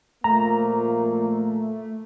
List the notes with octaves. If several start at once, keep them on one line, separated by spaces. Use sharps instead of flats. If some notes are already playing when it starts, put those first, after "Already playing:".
A#2 F3 A3 A#3 A#5